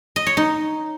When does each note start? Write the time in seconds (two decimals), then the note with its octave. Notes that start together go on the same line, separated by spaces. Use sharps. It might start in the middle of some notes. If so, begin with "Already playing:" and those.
0.16 D#5
0.26 C#5
0.37 D#4